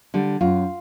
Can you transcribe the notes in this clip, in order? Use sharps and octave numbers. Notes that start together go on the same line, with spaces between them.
D3 G3
F#2 F4